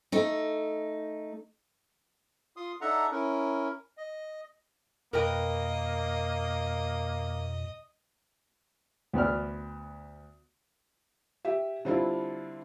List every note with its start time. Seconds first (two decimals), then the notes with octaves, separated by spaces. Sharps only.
0.12 A3 D#4
2.57 F4 C6 D#6
2.81 D4 D#4 A4 E5 F#5 A#5
3.12 C#4 E4 A#4
3.97 D#5
5.13 F2 B2 A#3 A#4 B4 D#5 G5
9.13 D2 B3 D5 F6
11.45 G4 E5
11.85 D3 G3 C4 D4 E4 F4